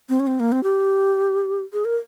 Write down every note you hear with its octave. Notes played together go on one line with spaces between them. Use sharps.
C4
C#4
C4
A#3
C4
G4
G#4
A#4